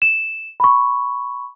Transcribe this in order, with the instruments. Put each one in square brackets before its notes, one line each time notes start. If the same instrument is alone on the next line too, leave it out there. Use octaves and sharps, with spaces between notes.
[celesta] E7
B5 C#6